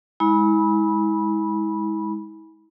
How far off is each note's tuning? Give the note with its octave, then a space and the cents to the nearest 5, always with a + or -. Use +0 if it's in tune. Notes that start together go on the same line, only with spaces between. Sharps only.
G#3 +0 E4 -40 B5 -20